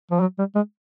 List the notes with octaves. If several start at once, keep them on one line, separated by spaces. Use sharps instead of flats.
F3
F#3
G3
G#3